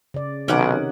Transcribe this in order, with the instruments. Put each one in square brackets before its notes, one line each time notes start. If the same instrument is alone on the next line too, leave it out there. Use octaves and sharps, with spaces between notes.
[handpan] C#3 D5
[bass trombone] B1 [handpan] C3 D#3 D#4 [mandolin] C#4 F#5 D6